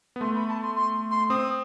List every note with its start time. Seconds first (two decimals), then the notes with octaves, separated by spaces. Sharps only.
0.16 B3
0.21 A3 C6
0.35 B5
0.48 A5
0.62 C6
0.75 C6
1.11 C6
1.30 C4 D#6